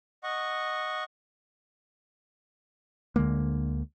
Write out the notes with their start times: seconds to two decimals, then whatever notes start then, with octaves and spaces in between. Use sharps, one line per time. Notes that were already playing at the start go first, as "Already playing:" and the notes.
0.23 D#5 F#5 C#6
3.16 D2 D3 G#3 A#3